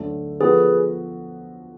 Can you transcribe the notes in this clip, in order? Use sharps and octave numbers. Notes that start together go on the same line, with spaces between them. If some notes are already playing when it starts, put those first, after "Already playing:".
Already playing: D2 D3 F#3 A3
F3 B3 F#4 G#4 A4 B4